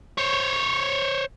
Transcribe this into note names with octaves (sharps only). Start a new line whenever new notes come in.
C5 C#5